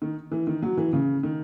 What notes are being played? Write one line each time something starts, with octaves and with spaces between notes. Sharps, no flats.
D#3
E3
D#3
F#3
E3
C#3
D#3